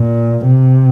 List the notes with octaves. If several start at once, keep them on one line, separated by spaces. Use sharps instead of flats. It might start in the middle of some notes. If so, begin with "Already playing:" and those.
Already playing: A#2
C3